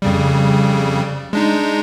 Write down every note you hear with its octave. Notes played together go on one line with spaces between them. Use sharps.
F2 C#3 G3
G#3 D4 D#4